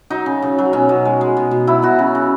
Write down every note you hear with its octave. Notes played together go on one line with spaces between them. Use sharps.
F#3 D#4
C#3
C#3
F#3
B2 C#4
B2
G#3
G#3
B2
B2
F#3 E4
B2 F#4
C#3
C#3